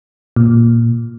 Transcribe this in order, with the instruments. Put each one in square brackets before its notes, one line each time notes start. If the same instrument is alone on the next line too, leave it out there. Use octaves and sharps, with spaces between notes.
[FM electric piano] A#2